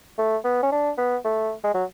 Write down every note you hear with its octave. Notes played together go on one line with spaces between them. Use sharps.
A3
B3
C#4
D4
B3
A3
G#3
F#3